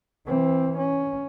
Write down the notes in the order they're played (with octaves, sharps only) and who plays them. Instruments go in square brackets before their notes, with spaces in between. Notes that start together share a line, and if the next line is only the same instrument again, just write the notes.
[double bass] E3 C4
C#4